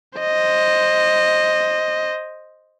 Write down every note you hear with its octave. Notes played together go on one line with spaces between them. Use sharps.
C5 D#5